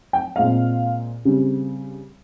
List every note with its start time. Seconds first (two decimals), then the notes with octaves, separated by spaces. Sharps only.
0.13 G5
0.36 A#2 G#3 C4 F5
1.25 C#3 G3 C4